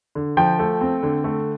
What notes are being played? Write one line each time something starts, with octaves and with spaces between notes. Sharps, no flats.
D3
F3 G5
A3
C4
D3
A3